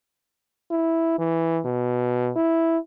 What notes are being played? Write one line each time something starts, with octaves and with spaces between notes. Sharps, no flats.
E4
E3
B2
E4